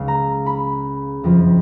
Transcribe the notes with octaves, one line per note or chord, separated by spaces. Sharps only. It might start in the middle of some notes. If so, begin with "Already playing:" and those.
Already playing: C#2 C#3 G#3 F5
A#5
B5
F#1 F2 F3